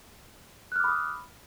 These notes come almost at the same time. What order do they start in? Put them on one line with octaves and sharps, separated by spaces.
F#6 F6 D6 B5 D#6